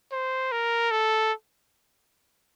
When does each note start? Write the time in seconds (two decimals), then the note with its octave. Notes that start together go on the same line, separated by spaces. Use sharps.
0.12 C5
0.52 A#4
0.91 A4